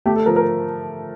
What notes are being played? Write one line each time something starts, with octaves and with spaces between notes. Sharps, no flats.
A3 G4
A4
F3 A#4
A#4